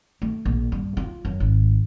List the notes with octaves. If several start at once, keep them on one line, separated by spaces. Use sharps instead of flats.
A3
A#1
G2
F4
F#2
G#1